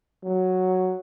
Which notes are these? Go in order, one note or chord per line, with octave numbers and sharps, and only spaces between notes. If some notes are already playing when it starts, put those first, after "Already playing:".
F#3